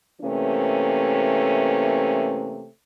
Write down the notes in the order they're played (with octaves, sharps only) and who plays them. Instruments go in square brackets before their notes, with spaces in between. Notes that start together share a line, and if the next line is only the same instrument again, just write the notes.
[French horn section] C3 E3 A3 A#3 C#4